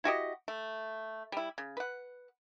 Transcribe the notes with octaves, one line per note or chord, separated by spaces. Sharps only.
E4 F#4 G4 D#5
A3
G3 E4
C#3
B4 F#5